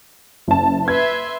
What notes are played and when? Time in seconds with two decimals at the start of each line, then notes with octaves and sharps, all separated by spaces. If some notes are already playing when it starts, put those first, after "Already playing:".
0.48 F#1 A5
0.88 B4 E5 C6 G#6